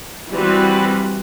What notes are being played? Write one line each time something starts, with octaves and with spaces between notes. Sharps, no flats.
E3 G3 C4 F#4 B4